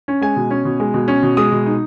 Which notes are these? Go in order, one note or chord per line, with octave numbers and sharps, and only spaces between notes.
C#4
G#3 G#5
B2
C#4
B2
G#3
B2
C#4
B2
G#3 D#6
B2
D#4